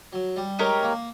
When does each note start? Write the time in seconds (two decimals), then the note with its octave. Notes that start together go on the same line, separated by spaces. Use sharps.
0.13 F#3
0.36 G3
0.59 G#3 D#4 G4 A#4 C#5
0.83 A#3